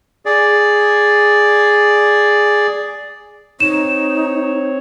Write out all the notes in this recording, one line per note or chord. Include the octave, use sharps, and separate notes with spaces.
G#4 D5
C4 D#4 C#5 E7